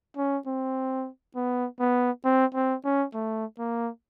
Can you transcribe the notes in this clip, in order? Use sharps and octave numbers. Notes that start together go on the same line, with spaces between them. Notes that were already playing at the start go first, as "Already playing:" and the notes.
C#4
C4
B3
B3
C4
C4
C#4
A3
A#3